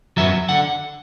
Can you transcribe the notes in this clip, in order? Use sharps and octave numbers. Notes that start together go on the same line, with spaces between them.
F#2 F#3 B3 E5
D3 F#5